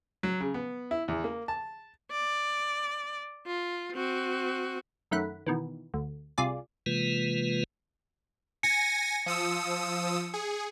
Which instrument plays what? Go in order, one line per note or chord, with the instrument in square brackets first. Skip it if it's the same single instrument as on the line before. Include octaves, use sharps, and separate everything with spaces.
[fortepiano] F#3
C#3
B3
E4
E2
A#3
A5
[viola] D5
F4
C4 F#4
[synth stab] F#2 D#3 A3 F#5 B5
B2 D#3 E3
D2
C2 C3 F4 G#4 D5
[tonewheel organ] C3 E3 G#3 A#3 F4 B4
[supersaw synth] G#5 A#6 [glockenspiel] C#7
[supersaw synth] F3 D#6 E6
G#4